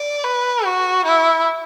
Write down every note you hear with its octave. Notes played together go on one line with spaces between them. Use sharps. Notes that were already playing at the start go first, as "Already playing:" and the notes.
Already playing: D5
B4
F#4
E4